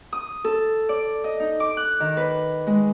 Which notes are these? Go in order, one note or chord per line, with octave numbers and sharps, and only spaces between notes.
D#6
A4
D5
D#5
D#4
D6
F#6
D#3
B4
G#3